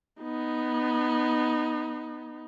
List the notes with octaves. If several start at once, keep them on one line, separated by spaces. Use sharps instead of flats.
B3 D#4